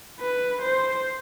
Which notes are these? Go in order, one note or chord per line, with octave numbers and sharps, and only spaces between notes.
B4
C5